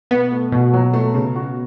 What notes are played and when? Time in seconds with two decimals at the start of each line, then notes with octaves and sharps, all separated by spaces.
0.11 B2 B3
0.32 A3
0.52 B2 F#4
0.73 F#3
0.94 A3
1.14 C#3
1.35 F#4